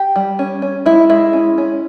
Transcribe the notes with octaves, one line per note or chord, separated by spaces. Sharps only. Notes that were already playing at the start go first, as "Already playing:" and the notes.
Already playing: G4
G3
C#4
C#4
G#3 E4
G#3 E4
C#4
C#4